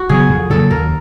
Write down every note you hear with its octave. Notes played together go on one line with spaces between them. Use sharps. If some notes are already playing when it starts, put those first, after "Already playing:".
Already playing: F#4
C#3 F#3 B3 G#4
F2
C#3 F#3 A#3 A4
D#2 A#4